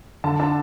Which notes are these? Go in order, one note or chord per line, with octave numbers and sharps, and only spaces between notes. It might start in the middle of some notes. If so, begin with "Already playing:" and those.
D3 A5
D4 A5